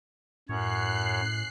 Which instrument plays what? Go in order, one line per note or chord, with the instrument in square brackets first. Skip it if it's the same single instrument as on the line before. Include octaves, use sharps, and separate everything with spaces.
[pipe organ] F#2 C#5 [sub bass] A2 [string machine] F#6 C7